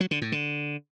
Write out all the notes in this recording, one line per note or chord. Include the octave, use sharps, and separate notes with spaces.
F#3
D3
A2
D3